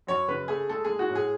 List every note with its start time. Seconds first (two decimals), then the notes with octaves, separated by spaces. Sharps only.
0.07 F#2 C#5
0.28 C#3 B4
0.48 A3 G#4
0.69 G#3 A4
0.85 G#4
0.90 G#3
0.99 F#4
1.09 A2
1.15 G#4